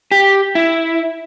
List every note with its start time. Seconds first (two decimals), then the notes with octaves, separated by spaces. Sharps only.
0.11 G4
0.55 E4